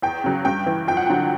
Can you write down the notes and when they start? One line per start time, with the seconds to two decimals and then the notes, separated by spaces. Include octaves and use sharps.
0.02 E2 G5
0.24 C#3 F#3
0.45 G2 G5
0.66 E3
0.87 F2 G5
0.97 F#5
1.07 D3 F#3 G5